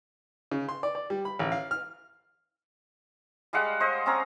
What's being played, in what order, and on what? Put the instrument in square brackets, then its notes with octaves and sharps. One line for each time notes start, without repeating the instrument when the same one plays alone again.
[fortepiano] C#3
C6
D5
D5
G3
B5
A1
F5
F6
[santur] G3 G#3 F5 F#5
C5 D#5
C4 C#4 A#5